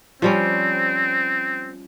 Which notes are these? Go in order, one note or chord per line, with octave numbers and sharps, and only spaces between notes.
F3 G3 C4 C#4